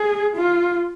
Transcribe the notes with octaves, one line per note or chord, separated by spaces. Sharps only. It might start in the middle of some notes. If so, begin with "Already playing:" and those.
Already playing: G#4
F4